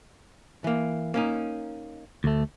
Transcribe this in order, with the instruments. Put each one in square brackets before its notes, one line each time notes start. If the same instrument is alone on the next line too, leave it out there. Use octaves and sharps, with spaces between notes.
[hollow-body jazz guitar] E3 A#3
A#3 C#4 D#4
[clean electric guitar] D2 A3